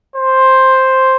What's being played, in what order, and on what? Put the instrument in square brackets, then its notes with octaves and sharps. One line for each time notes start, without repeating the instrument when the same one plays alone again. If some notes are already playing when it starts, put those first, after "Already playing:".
[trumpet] C5